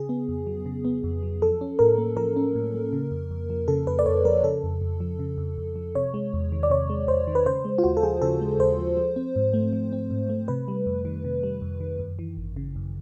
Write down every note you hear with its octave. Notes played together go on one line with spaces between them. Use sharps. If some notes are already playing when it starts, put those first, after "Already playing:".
Already playing: C#3 G#4
B3
F2
F#3
C#3
B3
F2
F#3
F3 A4
C#4
A2 A#4
A#3
F3 A#4
C#4
A2
A#3
C#3
F2
F2
F3
C#3 A4
F2 B4
D5
F2 C#5
F3 A#4
C#3 A4
F2
F2
F3
C#3
F2
F2
F3
C3 C#5
G#3
E2
D#3
D5
C3 C#5
G#3
E2 C5
D#3
B4
C#3 C5
G#3
F4
D#2 F#4
A4
F3 G#4
C#3 A4
G#3
D#2 C5
F3
F3
C4
G#2
A3
F3
C4
G#2
A3
C3 B4
G3
F2
D#3
C3
G3
F2
D#3
F#2
E3
G#1
C#3
F#2